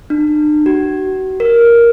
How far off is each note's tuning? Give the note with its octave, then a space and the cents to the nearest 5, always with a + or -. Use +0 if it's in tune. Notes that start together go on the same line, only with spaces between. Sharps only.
D4 +45
F#4 +35
A#4 +5